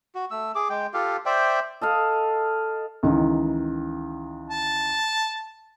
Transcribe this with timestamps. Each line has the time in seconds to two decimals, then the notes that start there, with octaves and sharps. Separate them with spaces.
0.15 F#4
0.31 A3 E6
0.55 G#4 D6
0.70 G#3 G5
0.94 F4 G4 A4 F5
1.26 C5 D5 E5 G5
1.81 A4 D#5 F5
3.03 C#2 D#3 E3
4.50 A5